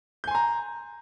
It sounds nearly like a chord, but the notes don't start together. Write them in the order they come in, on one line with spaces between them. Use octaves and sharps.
G6 G#5 C6 A#5